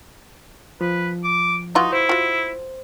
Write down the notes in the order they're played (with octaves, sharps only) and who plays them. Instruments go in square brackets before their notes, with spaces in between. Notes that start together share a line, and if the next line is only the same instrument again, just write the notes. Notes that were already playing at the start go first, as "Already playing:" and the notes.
[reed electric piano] F3 [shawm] B4
[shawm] D6
[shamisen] E3 F4 F#4 [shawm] D#4
[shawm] E4 [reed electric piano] C5
[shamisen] F4 F#4